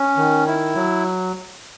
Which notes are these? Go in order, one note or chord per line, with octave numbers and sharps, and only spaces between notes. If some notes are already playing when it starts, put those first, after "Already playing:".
Already playing: C#4
D#3
E4
F#3